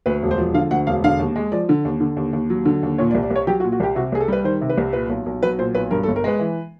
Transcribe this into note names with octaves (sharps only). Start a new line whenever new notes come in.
D2 B4
E1
C5
F3
D3 F5
D2 F#5
E1 F5
D3 F5
D#2
G#3
F3 D5
D3
D#2
D3
D#2
D#2
F#3
D3
D#2
A#2 C#5
D5
C2
D5
C2
C#5
F#3 G4
F#4
A#2
F#4
C2 G4
C3 F#4
C2 G#4
A4
G3 B4
D#3 C5
C3
B4
C2
A#2 B4
B1
B1
F#3 B4
A#2 C5
B1 B4
G2 A#4
A4
G1
A#4
G#3 B4
E3